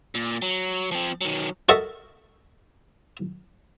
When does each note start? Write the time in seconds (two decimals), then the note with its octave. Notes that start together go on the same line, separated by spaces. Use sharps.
0.15 A#2
0.42 F#3
0.92 F3 C4
1.21 D#3 F#3
1.69 F#4 A4 A#4 D#5 E5 C#6